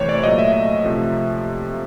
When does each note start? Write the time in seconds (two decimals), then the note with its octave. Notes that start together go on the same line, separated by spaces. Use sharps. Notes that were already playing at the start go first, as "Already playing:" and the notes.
Already playing: C3 E3 A3 C5 C#5
0.09 D5
0.24 A#2 F#3 A3 D#5
0.39 E5
0.84 C3 F3 A3